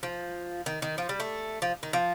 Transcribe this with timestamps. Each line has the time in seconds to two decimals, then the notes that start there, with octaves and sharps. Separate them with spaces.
0.03 F3
0.66 D#3
0.82 D#3
0.98 F3
1.09 G3
1.20 A3
1.62 F3
1.83 D#3
1.93 F3